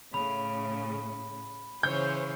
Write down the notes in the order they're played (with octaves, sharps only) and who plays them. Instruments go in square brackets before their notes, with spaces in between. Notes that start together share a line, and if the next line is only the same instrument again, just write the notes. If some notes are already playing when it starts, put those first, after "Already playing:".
[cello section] A2 C#3 [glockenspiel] B5
[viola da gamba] C#3 E3 [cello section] C5 C#5 [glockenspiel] F6 [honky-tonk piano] G6